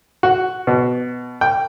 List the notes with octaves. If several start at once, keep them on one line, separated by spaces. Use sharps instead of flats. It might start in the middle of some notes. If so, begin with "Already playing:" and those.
F#4
B2
G5